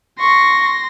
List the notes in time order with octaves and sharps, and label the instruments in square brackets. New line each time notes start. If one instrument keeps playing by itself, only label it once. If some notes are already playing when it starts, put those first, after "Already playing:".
[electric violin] C6 A#6 [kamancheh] C#6